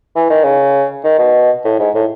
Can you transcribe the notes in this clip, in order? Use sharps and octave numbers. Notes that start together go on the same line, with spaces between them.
E3
D#3
C#3
D#3
B2
A2
G#2
A2